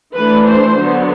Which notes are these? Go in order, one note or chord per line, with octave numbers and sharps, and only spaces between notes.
E3 A3 D4 B4
C5
D3 F#3 B3